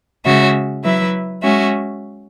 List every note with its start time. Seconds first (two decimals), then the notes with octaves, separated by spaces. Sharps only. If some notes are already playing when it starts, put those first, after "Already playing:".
0.25 C#3 G#3 C#4 F#4 E5
0.84 F#3 E4 B4 E5
1.43 G#3 C#4 F#4 E5